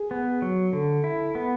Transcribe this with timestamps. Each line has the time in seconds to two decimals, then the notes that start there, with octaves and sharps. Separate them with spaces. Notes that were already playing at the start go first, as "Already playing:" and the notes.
Already playing: G#4
0.11 B3
0.42 F#3
0.73 D3 A4
1.04 E4
1.35 B3